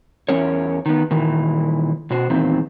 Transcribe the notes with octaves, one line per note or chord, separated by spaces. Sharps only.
E2 C#4 A#4 C#5
D#3 B3
A#2 D#3 E3
B2 F#4 C5
E2 A#2 D#3 C4